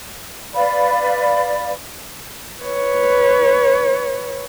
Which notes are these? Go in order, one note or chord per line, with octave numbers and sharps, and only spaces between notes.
B4 D5 F5 B5
B4 C#5